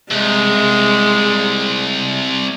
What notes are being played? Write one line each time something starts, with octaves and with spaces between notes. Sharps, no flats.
C2 G#3